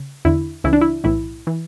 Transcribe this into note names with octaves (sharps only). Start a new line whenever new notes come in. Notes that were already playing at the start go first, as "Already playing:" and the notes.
Already playing: C#3
E2 D3 E4
C#2 C#3 E3 E4
D4
E4
B1 A2 E3 E4
E3